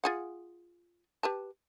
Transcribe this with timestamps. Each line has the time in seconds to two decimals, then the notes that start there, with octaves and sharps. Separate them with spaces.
0.04 F4 G#4 F#5
1.23 G4 B4 A5